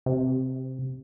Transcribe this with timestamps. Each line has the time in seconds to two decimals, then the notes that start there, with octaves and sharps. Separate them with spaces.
0.06 C3